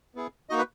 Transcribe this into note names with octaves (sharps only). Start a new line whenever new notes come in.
B3 E4 G#4
A#3 D#4 F#4 D#5
B4